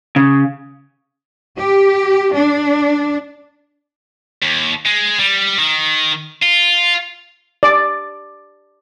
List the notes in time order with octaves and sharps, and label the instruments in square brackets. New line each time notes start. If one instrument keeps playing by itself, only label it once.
[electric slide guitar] C#3
[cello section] G4
D4
[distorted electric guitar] D#2
G#3
G3
D#3
F4
[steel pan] D5